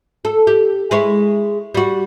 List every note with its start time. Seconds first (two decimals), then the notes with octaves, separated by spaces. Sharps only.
0.25 A4
0.47 G4
0.91 G#3 E4 C#5
1.74 G3 F#4